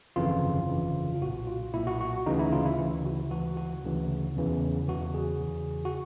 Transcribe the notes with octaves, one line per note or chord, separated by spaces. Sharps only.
G1 F2 C#3 E3 F4
G1 F2 C#3 E3
F4
B1 A#2 F#4
F4
B1 A#2 E4
F#4
F#4
D2 C#3 E3 D#4
E4
F4
E4
D2 C#3 E3 E4
F#4
D2 C#3 E3 F#4
F#4
D2 C#3 E3
E2 C#3 E3
E2 C#3 E3 F#4
G#4
E2 C#3 E3
F#4